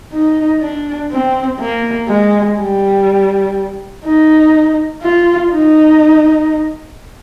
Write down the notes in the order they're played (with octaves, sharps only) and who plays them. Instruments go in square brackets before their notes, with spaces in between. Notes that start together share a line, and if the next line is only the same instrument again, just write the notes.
[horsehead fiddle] D#4
D4
C4
A#3
G#3
G3
D#4
F4
D#4